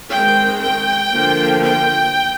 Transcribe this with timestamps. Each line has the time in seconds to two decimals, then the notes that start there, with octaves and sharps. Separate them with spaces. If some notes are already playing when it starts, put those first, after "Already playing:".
0.11 D#3 G#3 C4 G5
0.61 G5
1.13 D3 F3 A#3
1.63 G5